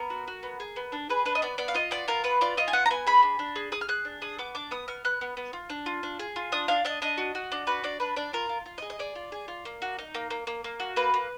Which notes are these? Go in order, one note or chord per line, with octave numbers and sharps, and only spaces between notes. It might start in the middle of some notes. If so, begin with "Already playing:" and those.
Already playing: B3 A#4
F#4
F#4
B3
G#4
B3
D4
G#4 B4
D4 B4
D#5
B3 D5
B3 D5
F5
F4 D#5
B3 D5
F4 A#4
B3 B4
F4 D5
F4 D#5
G#5
B3 F#5
A#5
B3 G#5
G#4 B5
D4
D4
G#4
G#4 D#6
F6
G#4 F#6
D4
G#4 D#6
B3 D6
D4 D6
B3 D#6
B3 F6
B3 F#6
B3
B3
F4
D4
F4
D4
G#4
F4
D4 D#6
D4 F5
D4 D#5
D4 D#5
F#4
F#4
D4
F#4 B4
D4 D5
D4 B4
D4 D5
F4 A#4
F4
F4
D#5
G#4
D#5
G#4 D5
F4
G#4
F4
A#3
F#4
D#4
A#3
A#3
A#3
A#3
F#4
A#3 B4
A#3